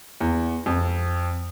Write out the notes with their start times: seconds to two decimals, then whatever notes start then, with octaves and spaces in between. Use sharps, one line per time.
0.21 E2
0.66 F2